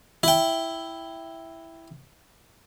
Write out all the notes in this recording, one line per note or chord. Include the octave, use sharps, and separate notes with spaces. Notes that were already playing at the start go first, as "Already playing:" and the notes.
E4 G5